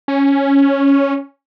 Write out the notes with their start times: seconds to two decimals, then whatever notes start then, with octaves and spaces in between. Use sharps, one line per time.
0.08 C#4